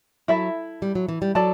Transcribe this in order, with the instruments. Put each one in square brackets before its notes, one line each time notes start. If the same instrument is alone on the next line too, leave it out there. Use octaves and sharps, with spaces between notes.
[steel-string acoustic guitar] F#3 [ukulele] E4 A4 E5 B5
[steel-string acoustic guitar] G3
F#3
E3
G3
[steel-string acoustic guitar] F#3 [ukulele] A4 D5 A5